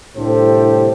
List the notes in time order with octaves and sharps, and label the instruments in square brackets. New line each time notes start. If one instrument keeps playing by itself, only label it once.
[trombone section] C2 A2 D3 G4 A4 C5